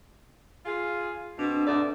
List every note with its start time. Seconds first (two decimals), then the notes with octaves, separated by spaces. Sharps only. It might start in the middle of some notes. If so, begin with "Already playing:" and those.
0.66 F4 G#4
1.39 B2 C4 D4
1.66 G#2 A3 D5